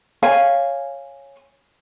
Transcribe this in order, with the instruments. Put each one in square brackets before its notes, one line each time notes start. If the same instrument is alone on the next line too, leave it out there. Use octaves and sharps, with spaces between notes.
[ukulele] C#5 F5 G#5